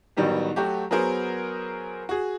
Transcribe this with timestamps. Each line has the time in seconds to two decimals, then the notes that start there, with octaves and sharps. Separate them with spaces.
0.17 A1 D#3 F#3 G3 B3 G4
0.56 F#3 A3 F#4 G4
0.91 F#3 B3 G#4 A#4 C5
2.09 F#4 G#4